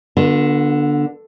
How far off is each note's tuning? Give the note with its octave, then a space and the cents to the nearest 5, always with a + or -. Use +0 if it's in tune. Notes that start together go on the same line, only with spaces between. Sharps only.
D3 +0 B3 -35 F4 +45